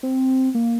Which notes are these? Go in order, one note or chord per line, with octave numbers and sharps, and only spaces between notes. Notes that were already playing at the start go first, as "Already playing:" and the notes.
C4
A#3